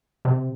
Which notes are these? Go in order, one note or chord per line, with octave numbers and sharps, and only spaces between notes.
C3